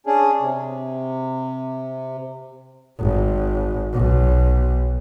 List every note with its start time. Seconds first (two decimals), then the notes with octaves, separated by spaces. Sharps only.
0.06 C#4 D4 G#4
0.41 C3
2.99 G#1
3.93 B1